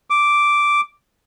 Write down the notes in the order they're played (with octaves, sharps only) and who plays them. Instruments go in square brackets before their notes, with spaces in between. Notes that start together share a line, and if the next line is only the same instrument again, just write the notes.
[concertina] D6